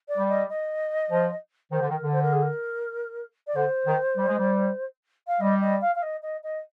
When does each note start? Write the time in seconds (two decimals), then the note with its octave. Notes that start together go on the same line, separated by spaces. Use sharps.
0.08 D5
0.18 G3
0.29 D#5
0.49 D#5
1.10 F3
1.71 D#3 C5
1.81 D3
1.90 D#3 A#4
2.02 D3
2.12 C5
2.22 A#4
2.33 G#4
2.42 A#4
3.47 D5
3.56 D3 C5
3.87 D#3
4.17 G3
4.28 G#3
4.38 G3
5.27 F5
5.40 G3 D#5
5.61 D#5
5.81 F5
5.95 F5
6.02 D#5
6.22 D#5
6.43 D#5